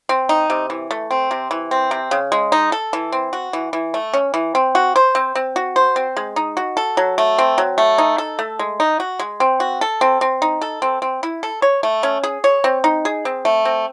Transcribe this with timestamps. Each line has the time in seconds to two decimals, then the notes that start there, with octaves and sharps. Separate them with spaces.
0.09 C4
0.29 D#4
0.50 C3
0.70 E3
0.91 A3
1.11 C4
1.31 C3
1.51 E3
1.71 C4
1.91 C3
2.11 C#3
2.32 G#3
2.52 D#4
2.72 A4
2.93 E3
3.12 C4
3.33 F#4
3.53 E3
3.73 E3
3.94 A3
4.13 C#4
4.34 E3
4.55 C4
4.75 F#4
4.96 C5
5.15 C4
5.35 C4
5.56 F#4
5.76 C5
5.96 C4
6.16 G#3
6.36 D#4
6.57 F#4
6.77 A4
6.97 F#3
7.18 A3
7.38 C4
7.58 F#3
7.78 A3
7.98 D#4
8.18 A4
8.39 A3
8.59 G#3
8.80 D#4
9.00 F#4
9.19 G#3
9.40 C4
9.60 F#4
9.81 A4
10.01 C4
10.21 C4
10.42 D#4
10.61 A4
10.82 C4
11.02 C4
11.23 E4
11.43 A4
11.62 C#5
11.83 A3
12.03 C#4
12.23 G#4
12.44 C#5
12.64 C4
12.84 D#4
13.05 G#4
13.25 C4
13.45 A3
13.65 C4